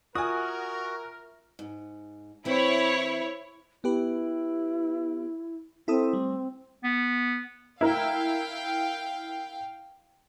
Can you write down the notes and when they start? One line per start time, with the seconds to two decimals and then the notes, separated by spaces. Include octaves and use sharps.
0.15 F4 F#4 A#4 E5 G#5 D#6
1.59 G#2
2.45 E3 C4 E4 C#5
3.84 B3 E4 G4 B4
5.88 C4 E4 A4 D#6
6.13 G3 A3
6.84 B3
7.81 E4 A#4 F5 G5